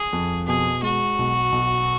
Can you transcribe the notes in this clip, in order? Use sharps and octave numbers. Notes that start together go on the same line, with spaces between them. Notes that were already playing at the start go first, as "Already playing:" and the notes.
Already playing: G#4
F2
B2 G#4
G#3 F#4
B1
B1